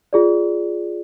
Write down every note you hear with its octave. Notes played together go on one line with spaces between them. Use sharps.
F4 G#4 D5